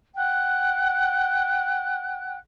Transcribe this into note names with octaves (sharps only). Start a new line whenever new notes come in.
F#5 G5 F#6